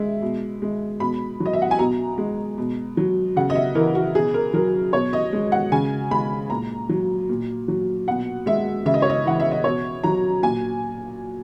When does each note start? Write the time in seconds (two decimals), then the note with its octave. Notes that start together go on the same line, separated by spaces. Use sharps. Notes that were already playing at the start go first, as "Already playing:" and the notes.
Already playing: G#3 E5
0.22 B2
0.62 G#3
1.00 B2 B5
1.40 F#3
1.46 D#5
1.53 E5
1.62 F#5
1.71 G#5
1.79 B2 A#5
2.18 G#3
2.58 B2
2.97 F#3
3.36 C#3 F#5
3.50 D#5
3.55 E5
3.75 E3 A#4
3.95 F#4
4.15 B2 G#4
4.34 A#4
4.54 F#3 A#4
4.93 B2 C#5
5.13 D#5
5.33 G#3
5.52 F#5
5.72 C#3 G#5
6.11 G#3 B5
6.50 A#2 A#5
6.89 F#3
7.29 A#2
7.68 F#3
8.07 B2 F#5
8.46 G#3 E5
8.86 C#3 E5
8.94 D#5
9.02 C#5
9.09 D#5
9.25 E3 F#5
9.40 E5
9.51 D#5
9.64 B2 C#5
10.04 F#3 A#5
10.43 A#2 G#5